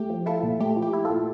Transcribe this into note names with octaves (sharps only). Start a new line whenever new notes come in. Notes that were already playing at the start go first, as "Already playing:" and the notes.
Already playing: A3 G4
F3
E4 F4 A4
A#2
A3 G4
F3
G4
E4
F4 A4
A#2